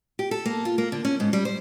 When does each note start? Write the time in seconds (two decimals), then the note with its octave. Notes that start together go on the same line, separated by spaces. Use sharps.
0.19 G4
0.31 A4
0.46 A#3
0.65 F4
0.78 A#3
0.92 D3
1.05 C#4
1.20 G#2
1.33 G3
1.45 C5